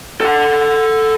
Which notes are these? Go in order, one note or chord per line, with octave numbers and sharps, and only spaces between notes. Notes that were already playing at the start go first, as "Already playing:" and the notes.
A4 F#5